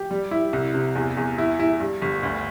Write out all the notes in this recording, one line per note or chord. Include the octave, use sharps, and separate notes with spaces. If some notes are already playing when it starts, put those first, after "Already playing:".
Already playing: G4
G3
E4
C2
C3
E2
E2
E4
E4
G2
G1
D2